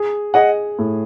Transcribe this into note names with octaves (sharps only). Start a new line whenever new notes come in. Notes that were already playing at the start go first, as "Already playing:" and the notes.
Already playing: G#4
G#4 D#5 F#5
A2